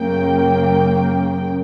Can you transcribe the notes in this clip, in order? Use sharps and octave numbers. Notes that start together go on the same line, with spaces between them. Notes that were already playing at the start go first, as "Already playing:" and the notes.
Already playing: F#2 C#3 F#3 A#3 G5